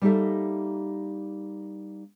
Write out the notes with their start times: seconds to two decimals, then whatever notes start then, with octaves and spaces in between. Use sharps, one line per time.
0.02 G3 A#3 D#4 G4 A4 E5